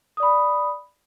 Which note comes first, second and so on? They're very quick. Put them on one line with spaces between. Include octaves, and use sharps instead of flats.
D#6 D5 B5